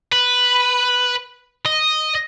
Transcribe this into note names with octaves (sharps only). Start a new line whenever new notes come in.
B4
D#5